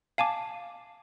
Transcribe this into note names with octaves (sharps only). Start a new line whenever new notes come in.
F5 G#5 A5 D6